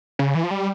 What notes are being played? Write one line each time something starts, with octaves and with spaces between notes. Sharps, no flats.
C#3
E3
F3
G3